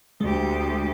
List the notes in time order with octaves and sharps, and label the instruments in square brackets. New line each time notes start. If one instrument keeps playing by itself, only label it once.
[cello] D2 G4 [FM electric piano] G#3